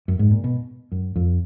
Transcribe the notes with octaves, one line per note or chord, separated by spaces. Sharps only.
F#2
G#2
A#2
B2
F#2
F2